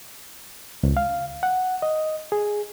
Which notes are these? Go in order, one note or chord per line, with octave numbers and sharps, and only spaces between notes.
C#2
F5
F#5
D#5
G#4